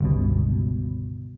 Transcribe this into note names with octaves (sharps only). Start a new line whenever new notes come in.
G1 C#2 B2